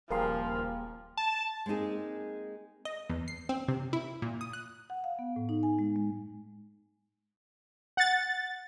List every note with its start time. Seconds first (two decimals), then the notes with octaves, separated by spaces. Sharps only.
0.10 D#1 F3 G3 A#3 G#4 A#4 F5 C6
1.17 A5
1.66 G#3 A#3 C4 D#4 G#4
2.85 D#5
3.10 E2
3.28 C7
3.49 C4
3.68 C3
3.93 E4
4.22 A#2
4.41 D#6
4.53 F#6
4.90 F#5
5.04 F5
5.19 B3
5.36 A2
5.49 D#4
5.63 G#5
5.79 G#3
5.96 G#3
7.97 F#5 A6